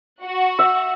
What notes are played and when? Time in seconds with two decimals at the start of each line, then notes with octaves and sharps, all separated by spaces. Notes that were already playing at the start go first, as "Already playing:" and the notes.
0.23 F#4 F#5
0.59 E5